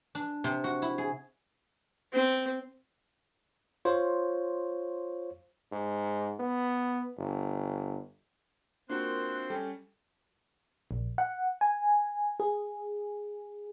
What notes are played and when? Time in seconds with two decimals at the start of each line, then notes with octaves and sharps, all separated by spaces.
0.15 D4
0.44 C3
0.64 F#4
0.82 E4
0.98 G#4
2.13 C4
3.85 F4 C5 C#5
5.72 G#2
6.40 B3
7.18 G1
8.89 A#3 C4 D4 F4 F#4 A#4 C6 F#6
9.50 G3 C#4 A4 G5
10.91 A#1
11.18 F#5
11.61 G#5
12.40 G#4